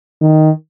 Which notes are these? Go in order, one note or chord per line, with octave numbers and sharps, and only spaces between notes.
D#3